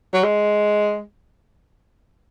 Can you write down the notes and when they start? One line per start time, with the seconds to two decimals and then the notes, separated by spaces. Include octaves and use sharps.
0.13 F#3
0.24 G#3